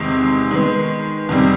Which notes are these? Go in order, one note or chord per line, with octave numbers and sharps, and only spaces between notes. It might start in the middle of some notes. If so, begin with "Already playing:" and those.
Already playing: E2 C3 D#3 G#3
D#3 G#3 B3
E2 C3 D#3 G3